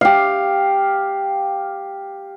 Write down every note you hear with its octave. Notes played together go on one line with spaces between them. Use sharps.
G4 F5